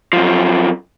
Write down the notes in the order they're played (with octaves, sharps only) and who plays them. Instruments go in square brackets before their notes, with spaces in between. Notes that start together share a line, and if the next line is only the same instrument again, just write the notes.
[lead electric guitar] F#2 F3